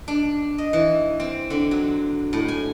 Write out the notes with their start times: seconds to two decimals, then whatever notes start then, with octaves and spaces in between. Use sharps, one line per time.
0.08 D4
0.58 D#5
0.73 E3
1.20 C4
1.50 D3
1.71 F#3
2.33 A2
2.48 G#5